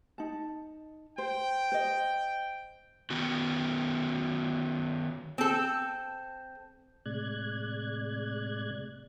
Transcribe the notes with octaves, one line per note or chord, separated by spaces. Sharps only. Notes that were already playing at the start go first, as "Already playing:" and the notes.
D#4 A5
C5 G5
C5 D#5
D#3 B3 F#4
C4 A4
A2 C3 G#3 D5 F#6 G#6